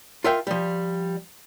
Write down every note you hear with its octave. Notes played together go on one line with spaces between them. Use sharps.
F4 A#4 E5 F5 G5
F3 G3